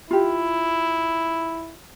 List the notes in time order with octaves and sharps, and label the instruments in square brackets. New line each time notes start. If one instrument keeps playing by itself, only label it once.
[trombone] E4 [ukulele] F4 G4